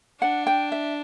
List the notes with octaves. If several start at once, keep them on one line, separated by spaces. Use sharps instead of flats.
D4 F#5
G5
E5